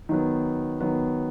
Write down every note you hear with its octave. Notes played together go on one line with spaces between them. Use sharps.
D#3 F#3 B3
D#3 F#3 B3